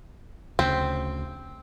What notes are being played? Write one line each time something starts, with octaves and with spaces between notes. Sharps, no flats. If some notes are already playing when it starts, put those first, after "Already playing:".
D2 C#3 C4